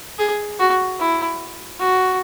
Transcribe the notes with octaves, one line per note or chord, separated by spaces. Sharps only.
G#4
F#4
E4
F#4